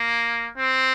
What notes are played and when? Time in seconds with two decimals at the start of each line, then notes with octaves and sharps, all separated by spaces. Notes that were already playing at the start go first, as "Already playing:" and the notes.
Already playing: A#3
0.58 C4